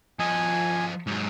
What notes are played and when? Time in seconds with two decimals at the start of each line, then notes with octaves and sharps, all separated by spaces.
0.19 F3 D#5 G#5
1.07 G#2 F#3